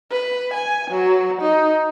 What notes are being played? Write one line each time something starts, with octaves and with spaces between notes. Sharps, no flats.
B4
G#5
F#3
D#4